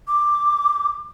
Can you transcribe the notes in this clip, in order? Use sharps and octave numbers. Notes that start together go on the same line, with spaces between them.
D6